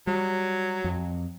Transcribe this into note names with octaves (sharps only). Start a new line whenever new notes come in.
F#3 G3
F2